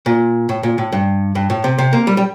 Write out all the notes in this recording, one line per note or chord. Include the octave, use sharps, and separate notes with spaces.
A#2
A2
A#2
A2
G2
G2
A2
C3
C3
A#3
G3
G3